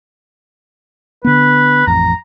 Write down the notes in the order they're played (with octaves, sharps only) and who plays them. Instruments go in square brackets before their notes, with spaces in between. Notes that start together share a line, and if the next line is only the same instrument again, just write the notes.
[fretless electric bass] D3 B3 [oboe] B4
[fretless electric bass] A1 F2 [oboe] A#5